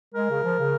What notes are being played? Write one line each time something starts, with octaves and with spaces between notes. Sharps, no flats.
G#3 A#4
C#3
F3
C#3